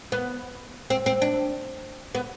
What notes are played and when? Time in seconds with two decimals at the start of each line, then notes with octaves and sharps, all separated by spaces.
0.12 B3
0.90 C4
1.06 C4
1.22 D4
2.15 B3